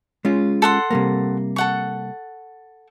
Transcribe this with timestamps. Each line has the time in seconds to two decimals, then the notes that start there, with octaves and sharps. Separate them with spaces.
0.25 G#3 C#4 F4
0.62 A4 F#5 C6
0.91 C3 G3 A#3
1.56 A4 F#5 C#6